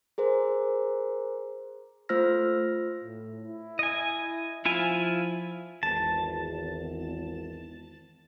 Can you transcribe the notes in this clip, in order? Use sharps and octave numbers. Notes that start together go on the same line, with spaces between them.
G#4 A#4 C5
A3 F4 C5 E6 F6 A#6
A2
E4
D#5 G#5
F3 E4 F4 G#5
G#1 E2 A5